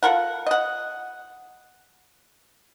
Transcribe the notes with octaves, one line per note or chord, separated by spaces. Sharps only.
F4 A4 A#4 F#5
D#5 F#5